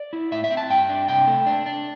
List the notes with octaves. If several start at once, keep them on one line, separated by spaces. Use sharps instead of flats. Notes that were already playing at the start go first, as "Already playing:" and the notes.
Already playing: D5
E4
A2 E5
E5
C4
A5
G2 G5
D4
C3 G5
A3
D4
D4